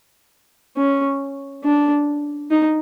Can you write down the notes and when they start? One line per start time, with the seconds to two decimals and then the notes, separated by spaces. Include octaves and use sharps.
0.77 C#4
1.64 D4
2.51 D#4